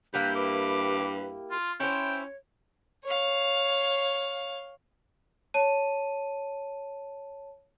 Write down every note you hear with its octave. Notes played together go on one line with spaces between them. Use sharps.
G2 A#3 E4 G4 B4 G6
B4 D6
F4 C6
C#4 E4 C5 C#5 G5
C#5 F5
C#5 A5 D#7